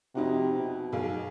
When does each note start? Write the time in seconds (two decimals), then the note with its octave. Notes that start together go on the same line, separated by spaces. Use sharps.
0.15 F2 C3 D#4 F#4
0.56 B2
0.93 B1 G#4 F5